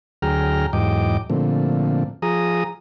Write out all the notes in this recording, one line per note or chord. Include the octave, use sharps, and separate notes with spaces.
D2 F#3 G#4 G5 A#5 F6
E2 G#2 F#3 D#5 G5 D6
A#2 D3 F3 A3 C4
F3 G#4 A#5 D#6